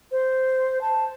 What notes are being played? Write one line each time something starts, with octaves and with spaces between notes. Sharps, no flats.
C5
A5